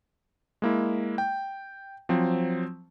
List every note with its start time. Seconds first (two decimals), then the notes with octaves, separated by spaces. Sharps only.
0.62 G#3 A#3 E4
1.18 G5
2.09 F3 F#3 C4